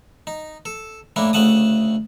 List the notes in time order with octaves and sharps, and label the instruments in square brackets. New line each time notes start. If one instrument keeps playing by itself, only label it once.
[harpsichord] D#4
A4
A2 A#3 D4 E4
D2 C#3 A3 F#5 A5 D#6